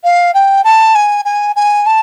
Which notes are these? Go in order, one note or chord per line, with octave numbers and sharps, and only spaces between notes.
F5
G5
A5
G#5
G#5
G#5
A5